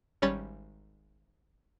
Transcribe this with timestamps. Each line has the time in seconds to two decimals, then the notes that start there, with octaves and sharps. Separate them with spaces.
0.22 G#1 G3 C#4 C#5 B5 A6